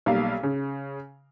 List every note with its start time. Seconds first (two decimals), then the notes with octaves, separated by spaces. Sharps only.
0.06 B1 G3 A#3 F5
0.43 C#3